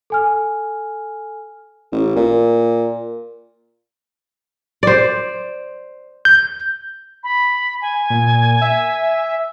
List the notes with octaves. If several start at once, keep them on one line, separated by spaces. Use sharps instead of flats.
A4 G#5 F6
A1
A#2
C5 D5
G6
B5
G#5
A#2
E5